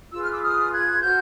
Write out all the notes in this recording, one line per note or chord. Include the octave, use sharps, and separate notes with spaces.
F4 G#4 B4 E6
F6
D6 E6
D#6 F6
F#6 G#6
F#4 A4 C5 F6 G6